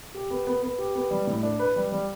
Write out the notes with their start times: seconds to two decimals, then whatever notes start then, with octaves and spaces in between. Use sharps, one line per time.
0.14 G4
0.31 B3
0.47 B3
0.62 B3
0.78 G4
0.95 B3
1.11 G3
1.27 A2
1.43 D4
1.59 B4
1.76 G3
1.92 G3